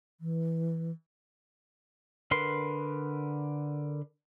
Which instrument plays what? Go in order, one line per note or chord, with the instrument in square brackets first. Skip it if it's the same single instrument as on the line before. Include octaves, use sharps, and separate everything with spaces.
[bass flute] E3
[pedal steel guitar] D3 A#4 B4 C6